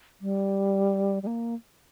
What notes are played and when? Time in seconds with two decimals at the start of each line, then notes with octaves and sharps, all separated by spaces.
0.21 G3
1.23 G3
1.27 A#3